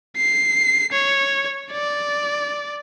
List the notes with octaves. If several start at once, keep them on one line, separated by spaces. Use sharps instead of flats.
C7
C#5
D5